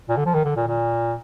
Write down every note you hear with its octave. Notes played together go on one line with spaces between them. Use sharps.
A#2
D3
F3
D#3
D3
A#2
A#2